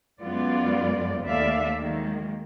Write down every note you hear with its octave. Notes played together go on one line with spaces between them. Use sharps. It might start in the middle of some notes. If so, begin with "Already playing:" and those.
F#2 G#3 B3 F4 D5
D#2 A3 D5 E5 F5
D#3 F#3 G#3 A#3